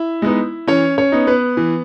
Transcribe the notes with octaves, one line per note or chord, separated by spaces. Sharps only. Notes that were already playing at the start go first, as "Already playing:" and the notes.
Already playing: E4 E5
G#3 B3 D#4
E3 C#4 C#5
C#4 C#5
B3 D#4
B3 B4
E3